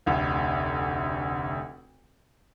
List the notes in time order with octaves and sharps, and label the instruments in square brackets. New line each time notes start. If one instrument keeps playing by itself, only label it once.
[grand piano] F1 D2